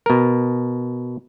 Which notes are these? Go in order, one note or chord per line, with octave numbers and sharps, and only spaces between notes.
B2 A#4